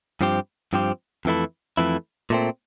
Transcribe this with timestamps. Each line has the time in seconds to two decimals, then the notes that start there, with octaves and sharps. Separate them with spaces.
0.21 G2 F3 C4 G4
0.73 G2 F3 C4 G4
1.25 F2 E3 A3 E4
1.77 F2 E3 A3 E4
2.30 A#2 A3 C4